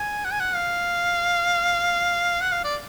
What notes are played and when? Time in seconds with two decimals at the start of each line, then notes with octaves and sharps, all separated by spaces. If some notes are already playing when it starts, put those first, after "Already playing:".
Already playing: G#5
0.25 F#5
0.32 G#5
0.40 F#5
0.55 F5
2.41 F#5
2.52 F5
2.64 D5